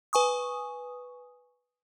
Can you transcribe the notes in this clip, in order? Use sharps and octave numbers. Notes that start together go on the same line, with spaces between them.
B4 G#5 C#6 D#6